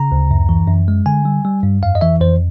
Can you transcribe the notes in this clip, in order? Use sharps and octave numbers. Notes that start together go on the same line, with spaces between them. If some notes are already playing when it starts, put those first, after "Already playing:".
Already playing: C#3 A#5
D2
F#2
E3
F#2
G#3
D3 G#5
G3
G3
G2
F2 F5
D#5
E3 E5
F2 C5